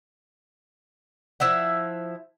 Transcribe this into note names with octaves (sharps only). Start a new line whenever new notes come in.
F3 E4 E5 F#5